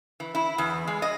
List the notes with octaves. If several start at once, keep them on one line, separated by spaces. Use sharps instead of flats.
E3
E4
E2
G#3
D#5